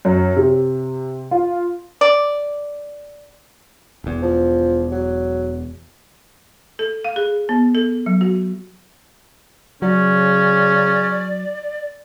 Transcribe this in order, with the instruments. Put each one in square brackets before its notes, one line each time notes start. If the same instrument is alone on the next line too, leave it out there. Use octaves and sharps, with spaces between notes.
[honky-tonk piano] F#2
C3
F4
[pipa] D5
[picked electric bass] E1 E2
[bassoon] F3
F#3
[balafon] A4
F5
G#4
B3
A4
F#3
F#4
[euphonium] C#3 [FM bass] F#3 [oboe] C#4 [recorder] D5